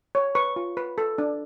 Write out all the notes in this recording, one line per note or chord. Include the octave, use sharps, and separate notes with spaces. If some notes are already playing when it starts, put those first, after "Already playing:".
C#5
B4 C#6
F4
B4
A4
D4